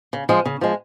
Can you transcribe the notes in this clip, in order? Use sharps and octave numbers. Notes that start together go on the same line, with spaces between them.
C#3
F3 G#3
C#3
F3 G#3